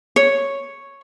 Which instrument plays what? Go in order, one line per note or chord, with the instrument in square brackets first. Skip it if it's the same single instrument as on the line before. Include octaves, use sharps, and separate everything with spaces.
[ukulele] C#5